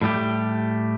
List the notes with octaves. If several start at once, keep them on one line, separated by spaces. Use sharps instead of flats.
A2 G3 A3 G4